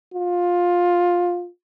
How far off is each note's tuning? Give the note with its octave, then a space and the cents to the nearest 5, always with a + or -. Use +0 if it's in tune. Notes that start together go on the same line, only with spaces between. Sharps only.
F4 +15